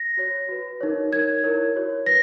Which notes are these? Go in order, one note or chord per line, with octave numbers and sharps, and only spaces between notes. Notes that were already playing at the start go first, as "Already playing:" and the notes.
Already playing: A#6
F#4 C#5
F#4 B4
D#4 A#4 C#5
D#4 A#4 C#5 G#6
E4 A#4 C#5
F#4 C#5
B4 A#6